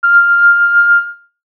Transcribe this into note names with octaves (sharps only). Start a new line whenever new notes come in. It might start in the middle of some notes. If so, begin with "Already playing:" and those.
F6